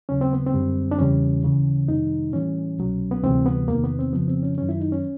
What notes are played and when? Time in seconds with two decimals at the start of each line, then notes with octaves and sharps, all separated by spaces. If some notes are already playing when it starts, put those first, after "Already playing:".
0.09 D#2 C#3 F#3 C#4
0.21 C4
0.33 B3
0.46 C4
0.54 F#2 D3 G3
0.91 D4
0.99 E2 C#3 E3 G3 C#4
1.43 D#2 C#3 E3
1.88 F2 C3 D#3 G3 D#4
2.33 A2 E3 G3 C#4
2.78 C2 B2 F#3
3.11 B3
3.23 D2 C3 E3 G3 C4
3.46 B3
3.68 E2 C3 D#3 A#3
3.84 B3
3.99 C4
4.13 F2 C#3 F3 B3
4.28 C4
4.43 C#4
4.58 F#2 D#3 F#3 C#4
4.69 E4
4.81 D#4
4.92 C#4